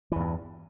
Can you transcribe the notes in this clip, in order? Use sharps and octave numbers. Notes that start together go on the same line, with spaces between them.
E2 G2 E3